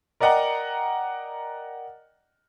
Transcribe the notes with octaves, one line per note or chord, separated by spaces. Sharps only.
A#4 D5 D#5 F#5 G5 A#5